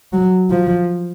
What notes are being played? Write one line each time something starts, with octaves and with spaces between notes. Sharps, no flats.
F#3
F3